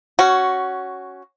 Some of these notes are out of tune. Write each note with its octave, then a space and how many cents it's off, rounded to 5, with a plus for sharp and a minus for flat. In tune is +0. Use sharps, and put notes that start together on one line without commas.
C#4 +0 F#4 +10